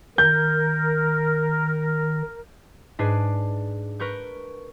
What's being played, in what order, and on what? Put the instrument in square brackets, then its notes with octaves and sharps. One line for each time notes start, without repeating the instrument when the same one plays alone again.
[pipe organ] D#3 [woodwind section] A#4 [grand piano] G6
[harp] G#2 D4 G#4 B4 C7
A#4 B4 C#6 G6